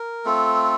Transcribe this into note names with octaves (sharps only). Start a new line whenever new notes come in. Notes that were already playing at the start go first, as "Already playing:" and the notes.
Already playing: A#4
A3 C4 F4 A4